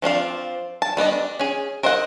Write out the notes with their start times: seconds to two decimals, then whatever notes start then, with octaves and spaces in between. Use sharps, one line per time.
0.02 F3 C4 D4 F5
0.82 A5
0.97 G3 B3 D5 D#5
1.12 D4
1.39 C#4 G#4
1.83 A#4 C5 D#5 E5 F#5